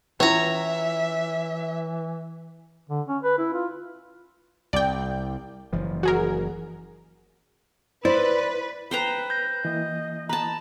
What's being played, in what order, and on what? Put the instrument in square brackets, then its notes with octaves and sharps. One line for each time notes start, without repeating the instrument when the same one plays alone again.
[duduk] E3 [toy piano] C#4 E4 F4 [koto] C#5 A#5 [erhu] E5
[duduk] D3
C#4
B4
E4
F4
[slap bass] C2 [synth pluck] D5 G5
[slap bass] F#1 E3 F3
[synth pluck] F#4 G#4 A#4
[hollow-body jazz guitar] E4 [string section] B4 [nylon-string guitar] C5 [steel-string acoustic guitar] D5
[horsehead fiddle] B4 [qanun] C5 G5 A#5
[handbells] G6 A#6
[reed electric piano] E3 A#3 E4 [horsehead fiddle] D#5
[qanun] B4 A5 [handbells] A#5